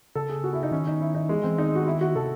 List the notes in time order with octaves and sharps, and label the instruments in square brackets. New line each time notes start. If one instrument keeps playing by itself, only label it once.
[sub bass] C#3 [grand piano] A4
[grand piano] G#4
F#4
E4
D#4
[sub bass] D#3 [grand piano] C#4
[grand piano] D#4
E4
D#4
[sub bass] E3 [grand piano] G#3
[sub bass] E3 [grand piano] C4
[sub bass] D#3 [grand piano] D#4
[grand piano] F#4
E4
F#4
[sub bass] C3 [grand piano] A4